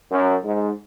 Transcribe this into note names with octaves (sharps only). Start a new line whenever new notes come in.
F#2
G#2